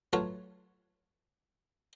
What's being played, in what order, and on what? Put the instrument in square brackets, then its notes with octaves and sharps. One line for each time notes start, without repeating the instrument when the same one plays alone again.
[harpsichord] F#3 A3 F4 F#4 B4 C#5